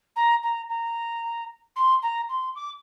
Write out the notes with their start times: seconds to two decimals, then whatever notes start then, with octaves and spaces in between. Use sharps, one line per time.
0.16 A#5
0.43 A#5
0.69 A#5
1.76 C6
2.02 A#5
2.29 C6
2.55 D6